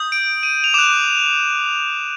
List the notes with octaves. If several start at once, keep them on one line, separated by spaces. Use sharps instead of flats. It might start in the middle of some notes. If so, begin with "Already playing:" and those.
Already playing: D#6 G6
D7
D#7
F7
D6 F#6 E7